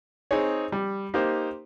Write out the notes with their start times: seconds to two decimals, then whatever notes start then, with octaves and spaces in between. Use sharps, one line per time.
0.31 C4 D#4 G#4 C#5
0.72 G3
1.14 A#3 D#4 G4 C5